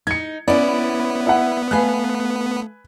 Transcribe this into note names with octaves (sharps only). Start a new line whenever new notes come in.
D#4 G#6 C#7
B3 C#4 E4 D5
E4 F#5
A3 B4 F5 G#5 F#6